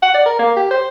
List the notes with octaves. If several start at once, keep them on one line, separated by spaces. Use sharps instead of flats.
F#5
D5
A#4
A#3
G4
C5